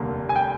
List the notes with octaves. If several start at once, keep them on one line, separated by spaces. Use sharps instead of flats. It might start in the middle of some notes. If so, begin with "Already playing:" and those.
Already playing: F1 D#2 D3 G3 A#3
G#5
G5